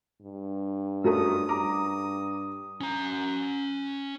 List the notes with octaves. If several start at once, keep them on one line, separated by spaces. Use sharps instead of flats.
G2
F#2 F#3 A3 D#6
G2 A#5 D6
C#4 A#5